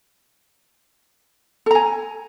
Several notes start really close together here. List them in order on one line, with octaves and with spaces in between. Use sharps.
A4 A#5 G#5